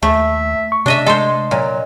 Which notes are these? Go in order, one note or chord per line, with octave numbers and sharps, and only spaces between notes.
D#2 A3 E5
C#6
C3 D4 D#5 E5
G#3 A4 C5 D#5 C6
A#2 F#3